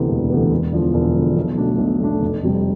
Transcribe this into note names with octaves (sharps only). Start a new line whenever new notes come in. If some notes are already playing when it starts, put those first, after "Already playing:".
Already playing: D2 C3 E3 B3
E1
D2 C3 E3 B3
E1
E2 D3 F3
E1
E2 D3 F3
B1
B2 A3 D4
B1
B2 A3 D4
F1
F2 C3 G3